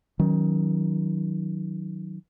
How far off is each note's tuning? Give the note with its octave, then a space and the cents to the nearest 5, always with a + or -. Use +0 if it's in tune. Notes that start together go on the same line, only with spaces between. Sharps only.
D#3 +20 F#3 +0 C#4 +5